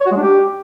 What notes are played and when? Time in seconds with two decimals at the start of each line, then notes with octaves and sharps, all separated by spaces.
0.01 C#5
0.06 F#4
0.11 G#3
0.17 D4
0.22 G4